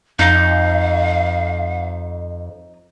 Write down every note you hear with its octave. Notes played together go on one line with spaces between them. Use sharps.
F2 D#4 F5